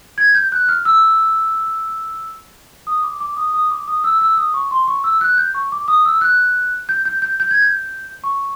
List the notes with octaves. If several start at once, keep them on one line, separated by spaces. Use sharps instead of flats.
G#6
G6
F#6
F6
E6
D#6
D6
D6
D#6
D#6
D6
D#6
E6
E6
D#6
C#6
C6
C#6
E6
F#6
G6
C#6
D6
D#6
E6
F#6
G6
G6
G6
G6
G#6
G6
C#6